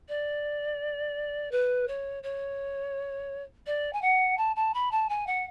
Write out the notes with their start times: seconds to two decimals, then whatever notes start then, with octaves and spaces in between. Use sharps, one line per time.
0.08 D5
1.51 B4
1.87 C#5
2.23 C#5
3.66 D5
3.93 G#5
4.02 F#5
4.37 A5
4.56 A5
4.74 B5
4.91 A5
5.09 G#5
5.27 F#5